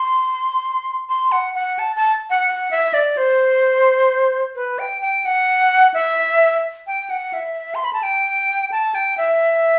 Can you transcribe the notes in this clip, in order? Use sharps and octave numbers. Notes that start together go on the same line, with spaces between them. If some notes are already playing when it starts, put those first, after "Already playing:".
Already playing: C6
C6
F#5
F#5
A5
A5
F#5
F#5
E5
D5
C5
B4
G5
G5
F#5
E5
G5
F#5
E5
C6
B5
A5
G5
A5
G5
E5